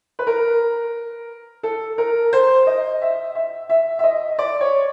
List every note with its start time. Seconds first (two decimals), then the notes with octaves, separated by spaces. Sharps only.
0.19 B4
0.27 A#4
1.63 A4
1.98 A#4
2.33 C5
2.67 D#5
3.02 E5
3.35 E5
3.70 E5
3.99 E5
4.04 D#5
4.39 D5
4.61 C#5